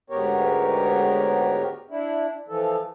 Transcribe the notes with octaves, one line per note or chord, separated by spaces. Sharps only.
D2 G#2 B3 G4 A#4 C#5
D4 E4
E3 F3 A4